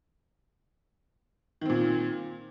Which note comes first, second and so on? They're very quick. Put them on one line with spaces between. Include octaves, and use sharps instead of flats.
D#3 C4 A#2